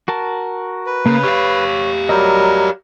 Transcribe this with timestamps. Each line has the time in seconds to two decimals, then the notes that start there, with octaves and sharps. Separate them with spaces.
0.08 F#4 A#4 A5
0.86 B4
1.06 C#3 A#3
1.23 G4 C#5 F5
2.09 F#3 G3 A#4 D#5 E6 G6